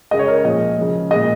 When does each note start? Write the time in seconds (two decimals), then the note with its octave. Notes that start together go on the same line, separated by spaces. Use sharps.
0.11 C#3 G#3 D#5
0.19 C#5
0.28 A#4
0.37 C#5
0.44 A#2 F3 G#3 D#5
0.77 C#3 F3 G#3
1.11 A#2 G#3 D#5